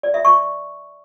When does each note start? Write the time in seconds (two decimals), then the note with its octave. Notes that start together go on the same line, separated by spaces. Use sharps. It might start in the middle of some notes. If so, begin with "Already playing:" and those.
0.03 D5
0.14 E5
0.25 C#6